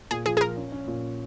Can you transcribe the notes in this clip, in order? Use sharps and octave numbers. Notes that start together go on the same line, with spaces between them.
A#2 G#4
F3 G#4
G#4
F3 A#4
C#4
C#4
A#2